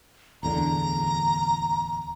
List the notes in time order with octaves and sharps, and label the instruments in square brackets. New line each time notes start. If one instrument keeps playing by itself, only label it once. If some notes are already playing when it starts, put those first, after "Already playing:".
[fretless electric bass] D1 E2 D3 [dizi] A#5